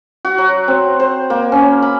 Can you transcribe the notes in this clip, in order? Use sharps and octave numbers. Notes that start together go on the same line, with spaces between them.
F#4
F#3
C4
C5
A#3
C#4
B5